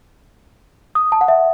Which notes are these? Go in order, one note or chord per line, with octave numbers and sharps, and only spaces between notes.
D#6
A5
F#5
E5